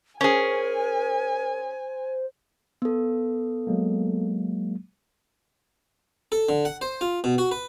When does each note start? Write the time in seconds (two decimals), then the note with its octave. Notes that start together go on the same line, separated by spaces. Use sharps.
0.21 C#4 G#4 A#4 C5 G#5
2.82 B3 A4
3.67 F#3 G#3 A#3
6.32 A4
6.49 D3
6.65 F#5
6.81 C5
7.01 F4
7.24 B2
7.38 F#4
7.51 B4